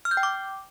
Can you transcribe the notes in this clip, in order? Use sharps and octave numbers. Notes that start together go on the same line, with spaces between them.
F6
G6
G5
D6